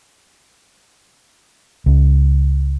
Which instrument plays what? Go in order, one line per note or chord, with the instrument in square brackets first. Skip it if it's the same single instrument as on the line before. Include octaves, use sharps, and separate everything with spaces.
[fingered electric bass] C#2